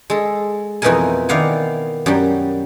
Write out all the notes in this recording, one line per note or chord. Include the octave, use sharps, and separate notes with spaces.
G#3 A4
F2 B2 E3 D#4 A#4 G#5
D#3 E4 D5 F5 F#5 G#5
F#2 G3